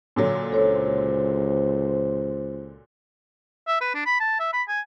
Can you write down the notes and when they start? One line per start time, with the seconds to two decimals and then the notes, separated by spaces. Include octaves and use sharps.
0.16 A#2 D3 F#3
0.52 C#2 A4 C5 C#5
3.67 E5
3.81 B4
3.95 D4
4.06 B5
4.20 A5
4.40 E5
4.53 B5
4.68 G#5